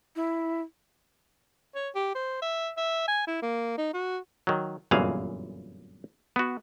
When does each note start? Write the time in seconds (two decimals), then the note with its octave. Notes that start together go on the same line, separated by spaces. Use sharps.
0.16 E4
1.75 C#5
1.95 G4
2.15 C5
2.42 E5
2.77 E5
3.08 G#5
3.27 E4
3.42 A#3
3.78 D#4
3.93 F#4
4.47 D#3 F#3
4.91 G1 F#2 A#2 E3 G#4 F5
6.36 B3 F#4